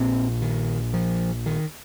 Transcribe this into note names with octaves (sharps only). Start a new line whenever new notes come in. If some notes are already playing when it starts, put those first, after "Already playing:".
Already playing: A#1 A#2 C4
D#3
F3
D#3